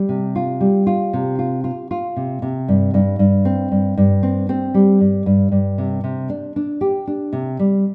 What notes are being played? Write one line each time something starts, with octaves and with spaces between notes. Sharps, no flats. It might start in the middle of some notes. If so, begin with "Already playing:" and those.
Already playing: G3
C3
F4
G3
F4
C3
F4
F4
F4
C3
C3
G2
G2
G2
C4
G2
G2
C4
C4
G3
G2
G2
G2
C3
C3
D4
D4
G4
D4
C3
G3